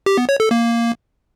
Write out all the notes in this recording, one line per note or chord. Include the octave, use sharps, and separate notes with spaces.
G4
B3
C#5
A4
A#3